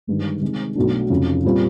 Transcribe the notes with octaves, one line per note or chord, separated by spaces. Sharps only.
G1 G2 D#3 G#3
C3 D#3 G#3
B1 B2 F#3 A3 D4
F1 F2 C#3
A#2 G3 C4 F4